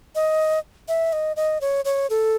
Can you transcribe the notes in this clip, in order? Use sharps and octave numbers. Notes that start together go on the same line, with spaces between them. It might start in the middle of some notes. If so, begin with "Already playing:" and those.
D#5
E5
D#5
D#5
C#5
C#5
A4